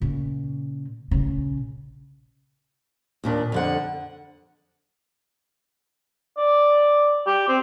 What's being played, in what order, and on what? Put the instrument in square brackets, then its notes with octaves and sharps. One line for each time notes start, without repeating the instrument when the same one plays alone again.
[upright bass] A#2 C#3
A#1 C#3
[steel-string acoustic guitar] D#2 A#2 D4
F2 D3 F#5
[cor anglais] D5
G4
C4